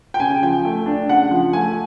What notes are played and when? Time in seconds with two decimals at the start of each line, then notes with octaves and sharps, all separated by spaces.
0.14 G5
0.20 C#3 G#5
0.42 F3 G5
0.65 A3
0.86 D4
1.09 C#3 F#5
1.31 F3
1.53 A3 G#5